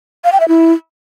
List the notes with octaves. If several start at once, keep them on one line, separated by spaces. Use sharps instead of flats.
F5
G5
E5
E4